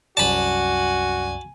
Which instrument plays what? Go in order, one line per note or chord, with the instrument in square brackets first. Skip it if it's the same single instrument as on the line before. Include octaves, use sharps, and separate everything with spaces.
[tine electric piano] C2 F#2 D5 [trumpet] F#4 [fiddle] G#5 [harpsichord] A5 B5